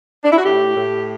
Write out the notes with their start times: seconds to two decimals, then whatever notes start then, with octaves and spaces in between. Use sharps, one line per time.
0.24 D4
0.32 E4
0.38 F#4
0.45 A2 G4
0.75 A2